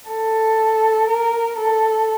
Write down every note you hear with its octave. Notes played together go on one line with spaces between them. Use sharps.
A4
A#4
A4